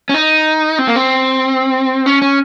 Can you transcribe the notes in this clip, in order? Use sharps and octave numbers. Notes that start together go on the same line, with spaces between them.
C#4
D#4
C4
A#3
C4
C#4
C#4